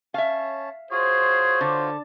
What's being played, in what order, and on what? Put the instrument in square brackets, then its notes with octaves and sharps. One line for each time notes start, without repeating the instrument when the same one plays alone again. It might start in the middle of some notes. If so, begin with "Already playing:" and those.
[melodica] C#4 C#5 A5 [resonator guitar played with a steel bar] E5 F5
[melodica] F4 F#4 C#5 [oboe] G#4 [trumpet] C5
[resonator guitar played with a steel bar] D3 [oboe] A5